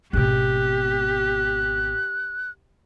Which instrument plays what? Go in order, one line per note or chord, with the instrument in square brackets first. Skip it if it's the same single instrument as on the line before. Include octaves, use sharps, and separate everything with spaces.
[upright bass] G#1 B2 [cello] G4 [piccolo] F#6